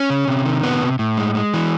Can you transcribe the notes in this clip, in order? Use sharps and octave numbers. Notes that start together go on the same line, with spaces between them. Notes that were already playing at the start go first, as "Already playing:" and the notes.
Already playing: C#4
C#3
C3
D#3
C3 B3
C3
A2
G#3
G#3
E3